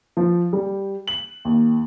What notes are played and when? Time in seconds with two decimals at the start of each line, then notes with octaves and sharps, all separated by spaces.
0.17 F3
0.53 G3
1.08 F#7
1.45 D#2